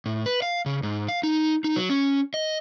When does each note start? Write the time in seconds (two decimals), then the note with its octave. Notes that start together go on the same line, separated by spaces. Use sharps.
0.06 A2
0.26 B4
0.42 F5
0.66 C#3
0.83 G#2
1.08 F5
1.23 D#4
1.64 D#4
1.76 F#3
1.90 C#4
2.34 D#5